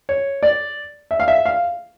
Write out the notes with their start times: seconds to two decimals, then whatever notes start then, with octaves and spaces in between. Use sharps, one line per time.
0.09 C#5
0.43 D5
1.11 E5
1.20 F5
1.28 E5
1.45 F5